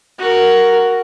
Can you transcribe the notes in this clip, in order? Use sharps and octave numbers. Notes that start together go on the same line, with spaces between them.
F#4 A#4